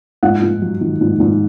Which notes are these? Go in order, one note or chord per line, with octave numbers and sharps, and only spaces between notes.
G#2 F#5
G#2
F#3
D#3
G#2
G#2